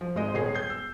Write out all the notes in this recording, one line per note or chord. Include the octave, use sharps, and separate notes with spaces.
F3
G#1 G#3 C5 D#5
D#1 B3 G#4 C#5 C7
G6 C7
E6